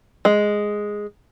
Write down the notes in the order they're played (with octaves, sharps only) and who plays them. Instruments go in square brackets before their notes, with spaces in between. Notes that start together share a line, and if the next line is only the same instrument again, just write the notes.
[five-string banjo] G#3